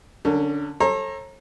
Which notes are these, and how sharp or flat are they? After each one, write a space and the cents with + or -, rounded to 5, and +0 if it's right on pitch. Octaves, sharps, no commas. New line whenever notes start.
D3 +0 C#4 +5 A#4 -35
A4 +5 C#5 -45 A#5 +0